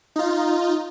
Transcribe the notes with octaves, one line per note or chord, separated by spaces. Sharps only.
D#4 F4